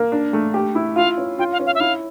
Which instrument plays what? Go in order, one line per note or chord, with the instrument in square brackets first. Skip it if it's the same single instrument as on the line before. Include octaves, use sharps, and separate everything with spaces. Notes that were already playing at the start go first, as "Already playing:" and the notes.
Already playing: [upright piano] A#3
D4
A3
G4
E4
[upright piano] F4 [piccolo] F5
[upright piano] C#4
[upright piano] F4 [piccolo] G5
[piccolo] F5
[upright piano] C#4
[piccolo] F5
E5
[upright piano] E4 [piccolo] F5